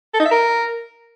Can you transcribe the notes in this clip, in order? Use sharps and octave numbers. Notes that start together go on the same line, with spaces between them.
A4
D#4
E5
A#4